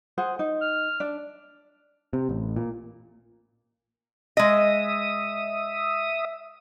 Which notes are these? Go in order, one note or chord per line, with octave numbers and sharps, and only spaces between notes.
G#4 C5 F#5
D#4
F6
D4
C3
A1
A#2
G#3 D#5 E5 D#6